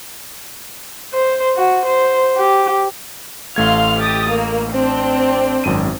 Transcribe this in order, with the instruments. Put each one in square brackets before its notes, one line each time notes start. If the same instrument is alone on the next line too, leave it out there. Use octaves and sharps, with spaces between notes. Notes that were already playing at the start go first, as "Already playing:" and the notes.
[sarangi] C5
F#4
C5
G4
[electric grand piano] A1 A3 G#6 [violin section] F5 C6 F6
[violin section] G4 D#6 A6
A#3
C4 D4 G5
[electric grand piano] G#1 F#2 D#7